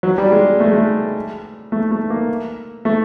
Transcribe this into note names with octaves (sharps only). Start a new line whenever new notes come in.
F#3
G3
G#3
A3
G#3
A3
A3
A3
A#3
A3